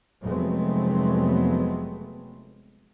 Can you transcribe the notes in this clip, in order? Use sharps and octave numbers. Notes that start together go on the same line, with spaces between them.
F1 F#3 G#3 A3 B3 C4